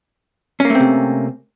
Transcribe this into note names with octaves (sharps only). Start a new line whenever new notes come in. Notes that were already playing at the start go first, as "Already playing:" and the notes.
C3 A3 A#3 C4 C#4